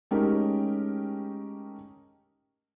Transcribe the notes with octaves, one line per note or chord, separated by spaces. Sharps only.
G#3 A3 C#4 D#4 G4 A#4